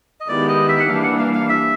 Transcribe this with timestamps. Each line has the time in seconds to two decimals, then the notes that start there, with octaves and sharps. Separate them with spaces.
0.20 D#5
0.28 D#3 G#3 B3 E4 G4 D5
0.48 D#5
0.69 E5
0.79 F#5
0.88 E3 G3 A#3 D4 F5
1.03 F#5
1.19 F5
1.34 F5
1.49 E5